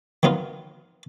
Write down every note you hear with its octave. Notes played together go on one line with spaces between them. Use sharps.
D#3 F#3 B3 D#4 F4